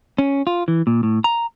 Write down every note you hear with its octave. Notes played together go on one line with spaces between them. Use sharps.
C#4
F4
E3
A#2
A2
A#5